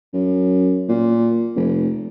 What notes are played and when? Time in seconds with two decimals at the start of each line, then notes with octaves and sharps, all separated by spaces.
0.13 F#2
0.89 A#2
1.56 F1